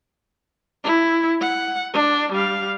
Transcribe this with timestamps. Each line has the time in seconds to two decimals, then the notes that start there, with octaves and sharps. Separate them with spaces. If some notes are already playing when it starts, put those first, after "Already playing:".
0.84 E4
1.41 F#5
1.94 D4
2.32 G3 F5